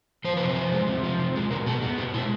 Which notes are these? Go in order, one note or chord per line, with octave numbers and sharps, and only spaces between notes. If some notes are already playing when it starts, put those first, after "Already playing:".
F3 C5
C3 B4
C5
F3
G#3
C3
F3
C3
G#3
B2 A#4
B3 A4
B3 G#4
B2 G4
G#3 E4